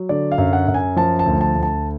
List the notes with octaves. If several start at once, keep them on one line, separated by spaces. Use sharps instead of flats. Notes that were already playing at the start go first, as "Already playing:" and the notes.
Already playing: F#3
D3 D5
F5
F#2
F#5
F#2
G#5
F3 A5
A5
D2
A5
D2
A5